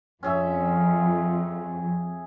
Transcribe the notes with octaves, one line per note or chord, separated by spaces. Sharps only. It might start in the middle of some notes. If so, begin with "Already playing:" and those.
F2 C#4 G#4 E5